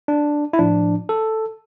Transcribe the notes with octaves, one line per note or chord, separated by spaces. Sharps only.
D4
E4
A2 F3 D4
A4